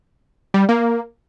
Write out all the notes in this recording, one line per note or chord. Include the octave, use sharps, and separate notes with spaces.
G3
A#3